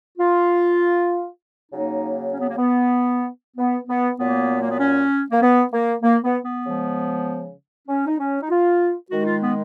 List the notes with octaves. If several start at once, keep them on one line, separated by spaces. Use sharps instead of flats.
F4
C#3 F#3 A#3 D#4
C#4
B3
A#3
B3
B3
B3
A#2 F#3 A#3 B3
A#3
B3
C#4
A#3
B3
A#3
A#3
B3
B3
C#3 F3 G#3
C#4
D#4
C#4
D#4
F4
D#3 G#3 F#4
D#4
F4
B3